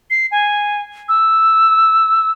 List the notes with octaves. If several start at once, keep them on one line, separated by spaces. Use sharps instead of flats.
C7
G#5
E6